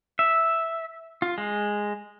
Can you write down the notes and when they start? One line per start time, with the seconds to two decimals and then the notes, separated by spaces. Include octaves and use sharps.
0.19 E5
1.22 F4
1.38 G#3